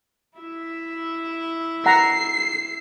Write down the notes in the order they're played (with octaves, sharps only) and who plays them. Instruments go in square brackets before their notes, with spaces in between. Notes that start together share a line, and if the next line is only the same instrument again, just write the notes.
[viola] E4 E5
[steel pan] F#5 A#5 [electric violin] C7